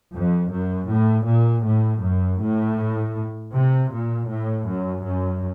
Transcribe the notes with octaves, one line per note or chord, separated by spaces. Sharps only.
F2
F#2
A2
A#2
A2
F#2
A2
C3
A#2
A2
F#2
F#2